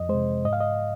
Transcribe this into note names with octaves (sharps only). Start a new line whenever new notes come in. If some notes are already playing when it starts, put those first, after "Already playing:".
Already playing: F2 D#5
C3 G#3 C5
G#2 D#5
F5
D#5